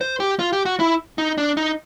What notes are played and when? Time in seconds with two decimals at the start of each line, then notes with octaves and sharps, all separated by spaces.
0.01 C5
0.20 G4
0.39 F4
0.53 G4
0.65 F#4
0.80 E4
1.18 D#4
1.38 D4
1.57 D#4